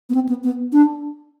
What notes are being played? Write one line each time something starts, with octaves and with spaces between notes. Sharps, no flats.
B3
C4
B3
B3
D4